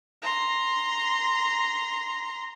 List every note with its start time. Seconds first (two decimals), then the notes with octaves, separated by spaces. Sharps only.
0.23 A#5 C6